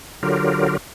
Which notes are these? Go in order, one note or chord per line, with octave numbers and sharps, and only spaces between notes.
D3 F#3 F4 G4 A#4